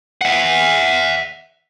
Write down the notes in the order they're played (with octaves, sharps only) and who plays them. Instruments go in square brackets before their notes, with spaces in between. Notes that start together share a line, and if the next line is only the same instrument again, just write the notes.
[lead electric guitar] E5 F#5